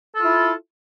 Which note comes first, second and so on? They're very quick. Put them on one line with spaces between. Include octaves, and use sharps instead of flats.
A4 F4 E4